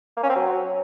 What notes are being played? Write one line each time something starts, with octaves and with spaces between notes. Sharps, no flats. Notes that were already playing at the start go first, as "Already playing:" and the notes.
A#3
C#4
C4
F#3